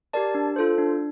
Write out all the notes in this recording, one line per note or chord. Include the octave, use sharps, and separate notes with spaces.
G4 A#4 D5 A5
D4
F4 A4 C5
D4